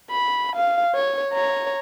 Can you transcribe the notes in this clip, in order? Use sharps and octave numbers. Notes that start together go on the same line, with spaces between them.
B5
F5
C#5
C#5 A#5